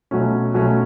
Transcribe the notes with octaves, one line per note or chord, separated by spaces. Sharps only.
B2 F#3 A3 C#4
B2 F#3 A3 C#4